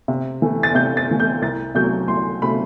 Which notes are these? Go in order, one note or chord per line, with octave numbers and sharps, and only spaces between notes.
C3
E3 A3
A6
C3 G6
A6
E3 A3
G6
C2 A6
C3 F#3 A3 G6
C2 C6
C3 F#3 A3 B5